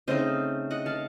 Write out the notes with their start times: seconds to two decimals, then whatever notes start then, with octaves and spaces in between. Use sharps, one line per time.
0.08 C#3 A3 C4 D#4 C5 D#5
0.71 D#5 F#5
0.86 F5 A5